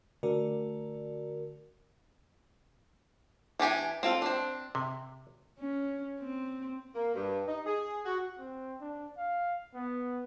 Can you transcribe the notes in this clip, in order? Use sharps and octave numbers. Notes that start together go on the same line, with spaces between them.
D3 A3 F#4 A#4 D5
E3 D4 G4 G#5
C4 F4 A4
C4 D4
C3
C#4
C4
A#3
G2
D#4
G#4
F#4
C4
D4
F5
B3